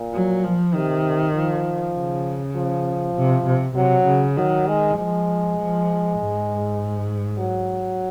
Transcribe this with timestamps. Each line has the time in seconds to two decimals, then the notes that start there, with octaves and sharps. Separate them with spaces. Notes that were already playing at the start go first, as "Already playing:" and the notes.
Already playing: A#2
0.14 F#3
0.44 F3
0.74 C3 D#3
1.34 F3
1.96 C#3
2.56 F3
3.15 C3
3.46 C3
3.76 C3 F#3
4.07 C#3
4.37 D#3 F#3
4.67 G#3
4.97 F3 G#3
5.58 F3
6.19 G#2
7.39 F#3